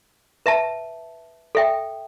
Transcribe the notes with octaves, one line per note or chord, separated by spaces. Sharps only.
B4 E5 A5
A4 E5 G5